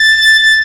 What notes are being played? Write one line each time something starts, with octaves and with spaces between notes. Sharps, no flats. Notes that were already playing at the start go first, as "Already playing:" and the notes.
Already playing: A6
A6